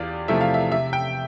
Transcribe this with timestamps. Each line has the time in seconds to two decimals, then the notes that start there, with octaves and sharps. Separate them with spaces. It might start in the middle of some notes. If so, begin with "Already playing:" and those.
Already playing: E2 F4 G4 D5
0.28 C3 F3 A3 E4 E5
0.41 F5
0.54 E5
0.72 C3 E5
0.93 G5